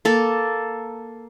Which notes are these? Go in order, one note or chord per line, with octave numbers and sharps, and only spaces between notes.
A#3 A4